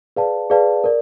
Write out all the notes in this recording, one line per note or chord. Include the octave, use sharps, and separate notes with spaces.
G#4 B4 D5 F5 A5
G#4 B4 D5 F5 A5
A#4 D5